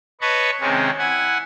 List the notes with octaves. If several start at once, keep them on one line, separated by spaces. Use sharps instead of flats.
B4 C#5 D#5 A5 B5 C#6
C3 D#3 G#3 C4 C#4
E4 F#5 G#5